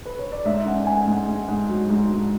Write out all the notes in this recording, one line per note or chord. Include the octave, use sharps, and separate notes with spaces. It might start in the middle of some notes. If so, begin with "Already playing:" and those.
B4
C#5
D5
G#2 E5
C#4 F#5
G#2 G#5
G#2
G#2
G#2
F#3
G#2
G#2